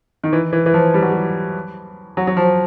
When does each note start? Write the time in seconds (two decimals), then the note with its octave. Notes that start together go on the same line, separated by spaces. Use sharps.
0.24 D#3
0.33 E3
0.53 E3
0.66 E3
0.74 F3
0.94 G3
1.02 F#3
1.10 G3
2.17 F#3
2.27 F#3
2.37 F3